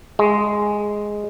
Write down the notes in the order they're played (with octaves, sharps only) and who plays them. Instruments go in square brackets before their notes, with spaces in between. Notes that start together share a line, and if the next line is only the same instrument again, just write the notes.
[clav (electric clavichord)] G#3